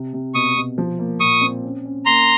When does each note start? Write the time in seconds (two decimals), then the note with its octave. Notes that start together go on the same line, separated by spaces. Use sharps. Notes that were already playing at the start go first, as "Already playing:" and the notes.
Already playing: C3
0.13 C3
0.34 B2 C#6 D#6
0.56 B2
0.78 F3
0.99 A#3
1.20 A#2 C#6 D#6
1.41 C4
1.64 C#4
1.85 C#4
2.06 A#3 A#5 C6